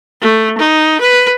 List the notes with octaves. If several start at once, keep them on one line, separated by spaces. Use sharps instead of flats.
A3
D#4
B4